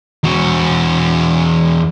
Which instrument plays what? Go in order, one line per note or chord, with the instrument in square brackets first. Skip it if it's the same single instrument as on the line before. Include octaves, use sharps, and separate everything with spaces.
[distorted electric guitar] E2 F#4